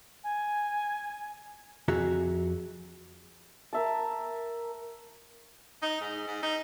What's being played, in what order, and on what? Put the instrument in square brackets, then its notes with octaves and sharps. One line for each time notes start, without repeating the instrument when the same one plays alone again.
[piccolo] G#5
[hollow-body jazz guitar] F2 F#4 G#4 E5 A#5
[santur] A#4 E5 A5
[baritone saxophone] D#4
G#2
G#2
D#4